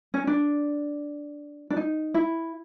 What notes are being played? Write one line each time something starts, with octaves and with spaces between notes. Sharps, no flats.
C#4
D4
D4
D#4
E4